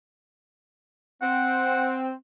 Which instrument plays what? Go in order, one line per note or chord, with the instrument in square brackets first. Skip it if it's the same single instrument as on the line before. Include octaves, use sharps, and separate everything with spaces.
[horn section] C4 [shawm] F#5